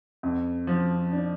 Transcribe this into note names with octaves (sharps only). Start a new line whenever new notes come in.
F2
F3
D4